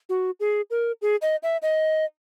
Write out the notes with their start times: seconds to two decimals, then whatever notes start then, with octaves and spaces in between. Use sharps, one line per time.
0.09 F#4
0.40 G#4
0.71 A#4
1.02 G#4
1.22 D#5
1.43 E5
1.62 D#5